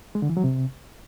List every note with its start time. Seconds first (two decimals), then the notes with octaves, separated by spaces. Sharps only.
0.15 G#3
0.22 D3
0.29 E3
0.37 F#3
0.44 C3